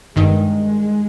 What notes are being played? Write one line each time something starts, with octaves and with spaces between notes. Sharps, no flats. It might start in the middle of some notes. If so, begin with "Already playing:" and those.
G1 G2 D#3 G#3